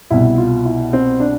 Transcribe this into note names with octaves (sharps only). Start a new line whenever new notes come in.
C2 B2 E4
F4
E4
C4
D4